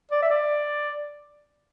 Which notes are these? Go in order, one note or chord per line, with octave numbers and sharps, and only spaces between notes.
D5
E5
D5